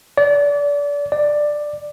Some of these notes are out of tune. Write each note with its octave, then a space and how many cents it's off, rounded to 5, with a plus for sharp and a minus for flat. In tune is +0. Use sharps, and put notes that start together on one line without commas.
D5 -30
D5 +10